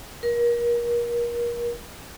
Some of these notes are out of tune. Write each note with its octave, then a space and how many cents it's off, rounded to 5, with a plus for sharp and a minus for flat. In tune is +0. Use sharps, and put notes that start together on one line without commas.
A#4 +30